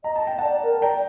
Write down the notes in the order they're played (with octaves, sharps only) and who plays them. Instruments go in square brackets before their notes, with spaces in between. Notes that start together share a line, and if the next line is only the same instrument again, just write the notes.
[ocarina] D#5 [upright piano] A#5
[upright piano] A5
G5
[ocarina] D5 [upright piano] F#5 A5
[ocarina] A#4
[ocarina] D5 [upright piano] G5 A#5